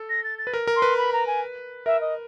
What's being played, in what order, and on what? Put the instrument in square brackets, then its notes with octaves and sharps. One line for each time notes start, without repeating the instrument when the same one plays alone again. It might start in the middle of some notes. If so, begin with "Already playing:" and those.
Already playing: [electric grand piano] A4
[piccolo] A#6
A6
A6
[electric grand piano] B4
A#4
A#4
[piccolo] C6
[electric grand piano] B4
[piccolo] B5
A#5
G#5
[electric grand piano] A#4 [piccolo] E5
[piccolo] D#5